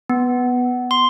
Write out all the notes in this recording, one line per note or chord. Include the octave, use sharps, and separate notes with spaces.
B3
C6